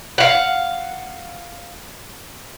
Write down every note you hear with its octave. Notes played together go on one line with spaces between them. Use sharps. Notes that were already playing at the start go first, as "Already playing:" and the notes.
F5 F#5